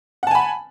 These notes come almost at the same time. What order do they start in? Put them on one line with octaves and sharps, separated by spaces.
F#5 A5 G#5 B5